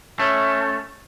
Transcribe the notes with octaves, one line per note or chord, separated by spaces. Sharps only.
A3 C#4